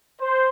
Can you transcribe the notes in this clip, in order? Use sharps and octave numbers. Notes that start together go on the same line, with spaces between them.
C5